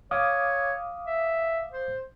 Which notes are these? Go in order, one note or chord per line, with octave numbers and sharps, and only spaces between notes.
C#5 F5 D6 D#6
E5
C5